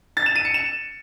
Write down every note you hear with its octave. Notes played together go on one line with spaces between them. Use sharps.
A6
E7
D#7
C#7
E7